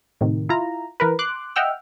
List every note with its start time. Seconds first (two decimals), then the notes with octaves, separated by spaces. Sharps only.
0.21 A2 C3 D#3
0.49 E4 F4 A#5
1.00 E3 A#4 B4
1.19 C6 D6 F#6
1.56 D#5 E5 F#5 G5 E6 F6